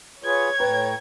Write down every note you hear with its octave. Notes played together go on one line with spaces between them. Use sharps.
F4 G#4 B4 C#5 G#6
A2 B4 G5 A#5